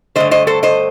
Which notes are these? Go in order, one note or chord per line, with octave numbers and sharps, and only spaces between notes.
G2 D3 A3 C5 D#5
C5 D#5
A4 C5
C5 D#5